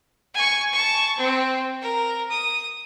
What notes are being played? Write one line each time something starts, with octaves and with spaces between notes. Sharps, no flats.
G#5 C#6
A5 C#6
C4
A#4
D#6